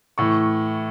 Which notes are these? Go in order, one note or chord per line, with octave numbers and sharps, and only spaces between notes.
A2 E3 C#6